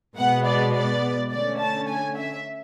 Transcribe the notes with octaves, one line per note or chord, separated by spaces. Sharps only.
B2 G#3 B3 F#5
D5
D5
D3 A3 C#4 D5
A5
G#5
E5